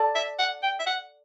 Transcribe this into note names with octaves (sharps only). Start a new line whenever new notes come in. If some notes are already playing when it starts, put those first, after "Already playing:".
Already playing: A4 D5 A5
E5
F#5
G5
E5
F#5